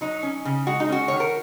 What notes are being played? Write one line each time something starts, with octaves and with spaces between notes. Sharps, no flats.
F#3 D#4
C#4
C#3
G#3 F#4
D#4
C#4 F#4
D#3 C#5
A#4